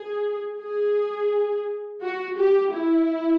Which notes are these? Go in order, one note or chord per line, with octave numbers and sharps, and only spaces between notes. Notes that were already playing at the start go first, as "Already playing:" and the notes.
Already playing: G#4
G#4
F#4
G4
E4